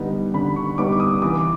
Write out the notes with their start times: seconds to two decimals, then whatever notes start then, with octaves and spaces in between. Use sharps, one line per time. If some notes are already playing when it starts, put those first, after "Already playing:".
Already playing: D3 G3 B3 D#4
0.34 D3 B5
0.56 C#6
0.78 G3 B3 D#4 D6
0.92 D6
1.00 D#6
1.22 E3 D6